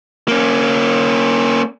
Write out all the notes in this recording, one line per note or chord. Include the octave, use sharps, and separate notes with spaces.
A#3 C#4